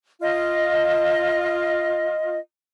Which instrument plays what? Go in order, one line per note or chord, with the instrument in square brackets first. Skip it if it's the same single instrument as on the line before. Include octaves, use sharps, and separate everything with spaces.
[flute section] F4 D#5